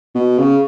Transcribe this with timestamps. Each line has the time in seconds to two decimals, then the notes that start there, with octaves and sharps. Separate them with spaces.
0.15 B2
0.39 C#3